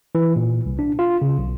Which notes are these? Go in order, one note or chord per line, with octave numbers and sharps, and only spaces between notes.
E3
A#2
C2
D4
F4
C#3
B1